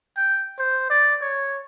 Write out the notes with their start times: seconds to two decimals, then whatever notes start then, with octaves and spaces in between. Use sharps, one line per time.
0.17 G5
0.59 C5
0.90 D5
1.21 C#5